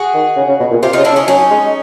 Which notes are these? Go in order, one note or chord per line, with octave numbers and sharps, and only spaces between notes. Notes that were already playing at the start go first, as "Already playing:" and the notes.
Already playing: F#4 G#4
D#3
C#3
C#3
B2
A#2
C3 F4 G4
C#3 D#4 F4
D4 E4
C#3
C#4 D#4
F#3 C#4 D#4
G#3